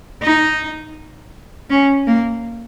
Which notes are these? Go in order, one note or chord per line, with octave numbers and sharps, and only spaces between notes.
D#4
C#4
A#3